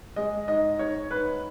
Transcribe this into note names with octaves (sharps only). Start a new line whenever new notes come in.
G#3 D#5
G#2 D#5
G#2 C#5
G#2 B4